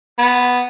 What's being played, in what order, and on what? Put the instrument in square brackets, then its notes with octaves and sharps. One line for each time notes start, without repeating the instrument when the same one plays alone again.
[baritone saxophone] B3